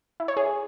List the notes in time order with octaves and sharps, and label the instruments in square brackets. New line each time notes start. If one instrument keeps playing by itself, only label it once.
[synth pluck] E4
C#5
G#4